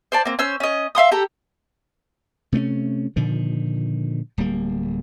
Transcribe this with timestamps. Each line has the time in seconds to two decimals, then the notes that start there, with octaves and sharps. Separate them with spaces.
0.12 C5 D5 A5
0.25 A#3 C4
0.39 C#4 C5 E6
0.60 C#4 D#5
0.95 E5 F5 C6 D#6
1.12 G4 A4 A#5
2.52 C3 A3 A#3 C#4
3.16 A#2 D3 D#3 F3
4.38 D1 G3 A#3